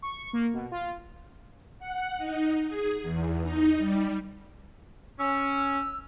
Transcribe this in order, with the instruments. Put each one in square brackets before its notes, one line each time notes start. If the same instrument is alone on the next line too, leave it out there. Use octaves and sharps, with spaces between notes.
[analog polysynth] C#6
A#3
B2
F4
[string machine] F#5
D#4
G#4
E2
D#4
G3
[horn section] C#4 [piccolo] E6